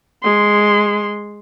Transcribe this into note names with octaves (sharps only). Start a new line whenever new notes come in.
G#3 C6